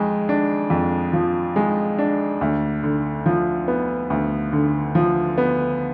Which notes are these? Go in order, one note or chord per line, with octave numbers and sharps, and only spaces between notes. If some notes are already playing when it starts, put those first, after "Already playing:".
Already playing: F2 G#3
D4
F2
F3
G#3
D4
D2
D3
F3
B3
D2
D3
F3
B3